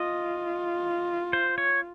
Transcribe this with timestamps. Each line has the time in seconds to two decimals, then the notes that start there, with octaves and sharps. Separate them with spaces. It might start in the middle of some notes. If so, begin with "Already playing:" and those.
Already playing: F4 D#5
1.33 C5
1.58 C#5